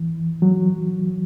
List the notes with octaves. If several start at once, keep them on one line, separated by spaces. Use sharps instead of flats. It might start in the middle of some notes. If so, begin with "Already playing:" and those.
Already playing: E3
F#3